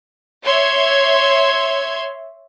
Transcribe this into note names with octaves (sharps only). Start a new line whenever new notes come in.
C#5 E5 C6 E6 G#6